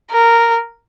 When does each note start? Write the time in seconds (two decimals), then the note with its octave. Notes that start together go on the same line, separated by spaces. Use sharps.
0.11 A#4